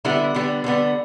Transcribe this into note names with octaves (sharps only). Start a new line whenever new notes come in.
D3 G3 B3 E4
D3 G3 B3
D3 G3 B3